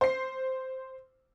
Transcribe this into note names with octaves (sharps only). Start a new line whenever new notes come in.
C5 C7